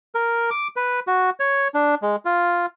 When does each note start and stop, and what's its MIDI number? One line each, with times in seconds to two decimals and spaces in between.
0.15 0.50 70
0.51 0.68 86
0.76 1.00 71
1.07 1.30 66
1.40 1.68 73
1.74 1.95 62
2.02 2.16 56
2.25 2.66 65